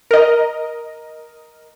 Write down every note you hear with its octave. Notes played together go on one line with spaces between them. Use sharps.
A#4 D#5